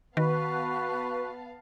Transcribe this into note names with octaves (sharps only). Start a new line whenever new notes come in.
D#3 B3 F#4 B4 F5 A5